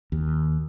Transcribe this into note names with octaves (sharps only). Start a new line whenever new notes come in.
D#2